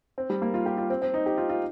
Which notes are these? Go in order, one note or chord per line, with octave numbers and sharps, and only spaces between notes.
C4
G3
A#3
F4
G4
F4
C4
C4
D#4
G4
F4
F4